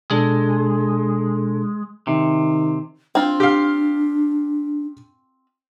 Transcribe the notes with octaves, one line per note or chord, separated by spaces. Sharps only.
B2 G#3 D4 A4
C3 D#3
C4 D4 F4
G4 F5